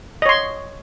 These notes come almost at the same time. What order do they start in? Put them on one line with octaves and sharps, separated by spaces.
D#5 C#5 C6